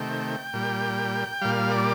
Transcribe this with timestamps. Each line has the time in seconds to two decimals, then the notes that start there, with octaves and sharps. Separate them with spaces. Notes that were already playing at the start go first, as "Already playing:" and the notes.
Already playing: C3 D#3 A3 G5
0.53 A#2 G3
1.42 A#2 G3 F5
1.71 D5